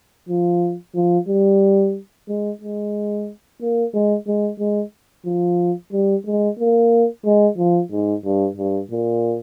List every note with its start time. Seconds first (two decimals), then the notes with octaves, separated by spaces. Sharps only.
0.29 F3
0.95 F3
1.28 G3
2.28 G#3
2.61 G#3
3.61 A#3
3.94 G#3
4.27 G#3
4.59 G#3
5.26 F3
5.92 G3
6.26 G#3
6.59 A#3
7.25 G#3
7.58 F3
7.91 G#2
8.25 G2
8.57 G2
8.91 A#2